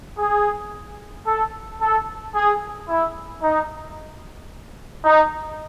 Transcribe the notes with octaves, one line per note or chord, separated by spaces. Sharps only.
G#4
A4
A4
G#4
E4
D#4
D#4